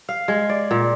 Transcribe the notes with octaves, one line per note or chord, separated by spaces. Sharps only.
F5
G#3
D5
A#2